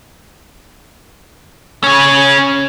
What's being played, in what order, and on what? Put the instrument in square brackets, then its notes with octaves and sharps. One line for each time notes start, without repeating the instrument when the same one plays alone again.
[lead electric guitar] C#3 C#4